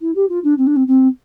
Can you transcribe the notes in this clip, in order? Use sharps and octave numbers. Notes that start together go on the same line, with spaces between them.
E4
G4
F4
D4
C4
D4
C4
C4